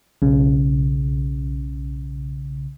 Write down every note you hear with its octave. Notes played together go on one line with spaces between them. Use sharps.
B1 C#3